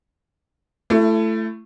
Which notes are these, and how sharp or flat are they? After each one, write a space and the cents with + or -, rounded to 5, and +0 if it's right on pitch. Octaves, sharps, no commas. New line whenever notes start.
A3 +0 E4 +30